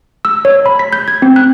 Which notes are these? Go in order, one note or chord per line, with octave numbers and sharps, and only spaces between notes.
E6
C#5
B5
B6
G6
G#6
C4
F#6